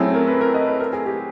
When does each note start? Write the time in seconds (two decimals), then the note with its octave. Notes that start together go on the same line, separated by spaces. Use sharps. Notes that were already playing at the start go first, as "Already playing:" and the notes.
Already playing: F#3 A3 C4 E4 G#4
0.14 A#4
0.27 B4
0.41 A#4
0.54 D#5
0.67 B4
0.80 A#4
0.93 G#4
1.06 G4